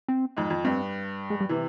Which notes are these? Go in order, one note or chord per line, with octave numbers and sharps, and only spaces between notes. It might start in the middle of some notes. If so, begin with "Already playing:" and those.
C4
F2 G#2
F2
G2 C4
G#3
G3
C3 E3